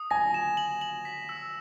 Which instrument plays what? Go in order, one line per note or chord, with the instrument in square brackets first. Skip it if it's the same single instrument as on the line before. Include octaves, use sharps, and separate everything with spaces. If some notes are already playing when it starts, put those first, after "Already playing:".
Already playing: [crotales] D#6
[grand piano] G#5 [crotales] A#6
[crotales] E7
F#7
F#7
B6
E6